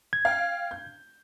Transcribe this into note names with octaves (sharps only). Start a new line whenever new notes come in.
G#6
F5 G5
G6